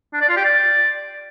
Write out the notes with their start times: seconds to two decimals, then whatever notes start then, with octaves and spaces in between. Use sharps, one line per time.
0.13 D4
0.21 D5
0.29 F4
0.37 G4
0.44 D5